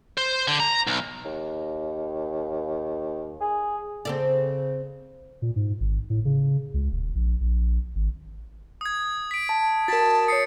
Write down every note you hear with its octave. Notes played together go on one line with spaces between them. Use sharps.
C5
D3
A#5
B1
D#2
G#4
C#3 C4 A4 D5
A#2
G#2
G#1
A2
C#3
C#2
D#1
A#1
A#1
G#1
D#6 G#6
B6 D7
A5
F#4 A#4 A5 A6 B6
C#5 D#6 C7 C#7